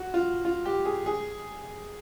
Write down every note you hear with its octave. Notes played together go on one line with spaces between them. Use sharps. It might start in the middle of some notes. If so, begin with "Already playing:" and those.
Already playing: F#4
F4
F4
G4
G#4
G#4